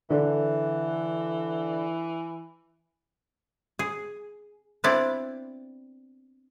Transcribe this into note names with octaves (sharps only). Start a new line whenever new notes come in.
D3 E3
G#4
B3 C4 D4 E4 D5